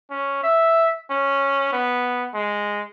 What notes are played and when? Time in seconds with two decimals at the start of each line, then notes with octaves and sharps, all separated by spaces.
0.10 C#4
0.43 E5
1.11 C#4
1.73 B3
2.34 G#3